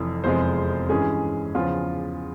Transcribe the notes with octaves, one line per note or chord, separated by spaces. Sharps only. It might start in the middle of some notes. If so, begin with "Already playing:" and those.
Already playing: F1 F2 E3
F1 E2 C3 F3 G#3 C5
G2 E3 G#3 C#4 G#4
E2 C#3 F3 F4